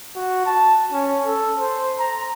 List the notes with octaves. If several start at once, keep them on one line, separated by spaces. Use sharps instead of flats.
F#4
A5
C#4
A4
C5
A#5